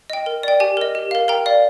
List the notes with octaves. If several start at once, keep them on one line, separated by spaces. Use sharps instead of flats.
D#5 G5
A#4
D5 G5
G4 G#5
A#4 D#5
G4
A#4 F5
A#4 G5 A#5
D5 F5